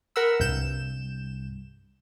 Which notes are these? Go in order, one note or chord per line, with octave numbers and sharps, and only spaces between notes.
A#4 F#5 B5 E6
C2 G2 G6 E7